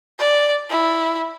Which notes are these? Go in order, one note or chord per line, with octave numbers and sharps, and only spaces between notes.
D5
E4